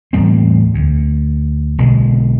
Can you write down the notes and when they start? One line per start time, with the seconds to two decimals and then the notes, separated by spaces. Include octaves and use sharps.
0.13 E2 A2 G3 C4
0.74 D2
1.78 B1 B2 D3 G#3